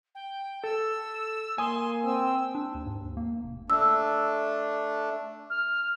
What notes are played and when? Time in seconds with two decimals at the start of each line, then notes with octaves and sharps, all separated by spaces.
0.15 G5
0.64 A4 E6
1.58 A#3 G#5 C6 D#6
2.05 C4 E6
2.55 D4
2.74 D#2
2.86 G#2
3.00 D#2
3.17 A#3
3.43 F1
3.70 A3 D4 E6
5.50 F6